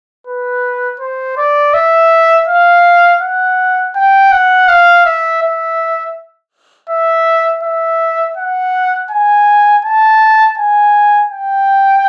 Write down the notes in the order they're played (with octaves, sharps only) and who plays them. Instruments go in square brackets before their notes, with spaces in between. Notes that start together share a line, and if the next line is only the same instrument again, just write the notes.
[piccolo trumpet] B4
C5
D5
E5
F5
F#5
G5
F#5
F5
E5
E5
E5
E5
F#5
G#5
A5
G#5
G5